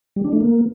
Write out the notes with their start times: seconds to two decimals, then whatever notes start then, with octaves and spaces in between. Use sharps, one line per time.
0.16 G3
0.24 D4
0.32 A3
0.41 A#3